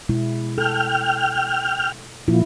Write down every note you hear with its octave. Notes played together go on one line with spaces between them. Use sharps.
B2 G#3 E4
A4 G5 F6
A#2 F3 E4